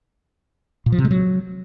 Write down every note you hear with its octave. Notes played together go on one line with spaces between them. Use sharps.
A#2
F3
C3
G#3
F#3